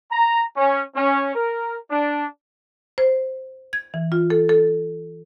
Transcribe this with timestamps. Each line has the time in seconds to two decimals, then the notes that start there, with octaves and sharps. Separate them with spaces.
0.12 A#5
0.57 C#4
0.96 C#4
1.34 A#4
1.91 D4
2.98 C5
3.73 G#6
3.94 E3
4.12 F4
4.30 A4
4.49 A4